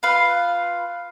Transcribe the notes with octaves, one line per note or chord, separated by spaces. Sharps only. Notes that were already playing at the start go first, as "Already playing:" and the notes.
F4 B4 F5